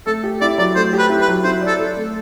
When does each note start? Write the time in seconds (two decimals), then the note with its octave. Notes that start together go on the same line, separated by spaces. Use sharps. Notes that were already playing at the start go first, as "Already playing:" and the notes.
0.06 A3 A4
0.24 G4
0.41 E4 D5
0.58 F#3 D5
0.75 A3 C5
0.93 G4
0.99 B4
1.10 E4
1.21 B4
1.28 F#3
1.44 E4 C5
1.61 D5
1.67 A4
1.78 A4
1.97 A3